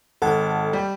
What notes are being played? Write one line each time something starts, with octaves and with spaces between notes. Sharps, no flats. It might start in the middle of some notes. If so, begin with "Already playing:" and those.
G#1 A4 F#5 A5
G3